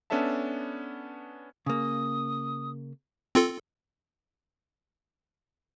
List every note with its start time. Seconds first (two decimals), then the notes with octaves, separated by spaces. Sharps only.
0.10 B3 C#4 D4 A4 E5 A5
1.66 C#3 A#3 D#6
3.35 C4 F4 A4